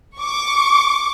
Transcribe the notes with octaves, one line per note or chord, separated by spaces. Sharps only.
C#6 D6